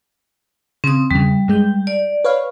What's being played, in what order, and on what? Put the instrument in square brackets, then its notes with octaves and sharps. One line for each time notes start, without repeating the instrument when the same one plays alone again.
[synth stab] C#3 [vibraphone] C4 D#6
[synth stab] E2 C#3 [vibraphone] G3
[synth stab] G2 G#3 G6
[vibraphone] D5
[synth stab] B4 C#5 F5